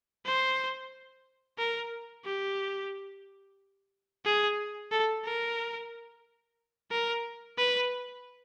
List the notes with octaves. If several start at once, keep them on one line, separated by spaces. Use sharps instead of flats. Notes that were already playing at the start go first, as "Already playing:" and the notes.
C5
A#4
G4
G#4
A4
A#4
A#4
B4